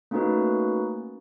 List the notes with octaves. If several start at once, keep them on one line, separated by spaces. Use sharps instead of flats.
A3 A#3 C#4 D#4 F#4 B4